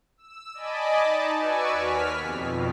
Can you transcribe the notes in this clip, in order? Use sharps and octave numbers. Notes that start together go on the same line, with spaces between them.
E6
D5 D#5 G#5 A5 B5 D6
D#4 A5
F#4 B4 D5 G#5 C#6 E6
D#2 F6 B6
F2 B2